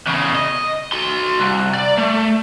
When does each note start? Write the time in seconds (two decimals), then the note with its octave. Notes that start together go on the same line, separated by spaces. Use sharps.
0.06 E2 C#3
0.35 D#5
0.92 F#4 C6
1.40 C2
1.74 D5
1.98 A3